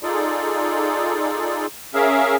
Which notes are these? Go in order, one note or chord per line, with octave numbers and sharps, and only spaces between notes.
D#4 F4 G#4 A4 D5
C#4 G#4 A#4 E5 F5